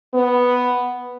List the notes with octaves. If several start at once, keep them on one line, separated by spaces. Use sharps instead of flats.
B3